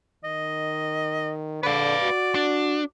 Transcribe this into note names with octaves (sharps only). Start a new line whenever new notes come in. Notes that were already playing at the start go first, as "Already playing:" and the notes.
D#3 D#5
D3 B4 D5 F5
F#4
D4